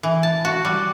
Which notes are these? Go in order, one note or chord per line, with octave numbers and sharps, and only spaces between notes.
E3
A5
F#4
G3